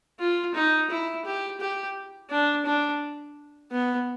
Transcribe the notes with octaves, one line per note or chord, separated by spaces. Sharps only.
F4
D#4
E4
G4
G4
D4
D4
B3